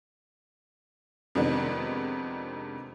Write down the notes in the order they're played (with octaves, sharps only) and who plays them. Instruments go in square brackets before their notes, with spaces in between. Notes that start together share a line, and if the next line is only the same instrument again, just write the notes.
[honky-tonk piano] F2 C3 D#3 G#3 B3 D4